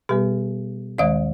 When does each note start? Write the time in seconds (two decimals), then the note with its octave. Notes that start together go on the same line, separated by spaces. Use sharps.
0.09 B2 G3 B3 G4 B4
0.98 D#2 D#3 G#3 D5 F5